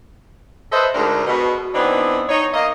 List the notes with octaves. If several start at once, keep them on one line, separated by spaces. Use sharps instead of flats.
A4 B4 C5 D#5 E5
D2 G#2 D4 A#4
B2
E3 B3 C4 D4 D#4
D#4 C#5
A#3 D#5